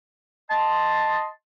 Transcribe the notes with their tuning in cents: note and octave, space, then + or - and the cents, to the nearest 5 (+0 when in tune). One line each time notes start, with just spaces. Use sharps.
D#5 +0 A5 +0 C6 +0